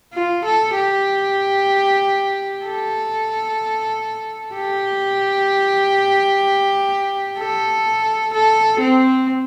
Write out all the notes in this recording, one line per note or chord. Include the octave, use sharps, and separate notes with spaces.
F4
A4
G4
A4
G4
A4
A4
C4